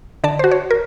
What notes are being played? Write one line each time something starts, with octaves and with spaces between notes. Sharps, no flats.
D3 D5 A5
F#4 C5
C#5
A#4